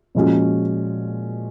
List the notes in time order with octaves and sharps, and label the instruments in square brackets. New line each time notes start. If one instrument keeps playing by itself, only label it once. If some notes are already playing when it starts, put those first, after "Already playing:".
[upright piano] A#2 F3 G#3 C#4 F#4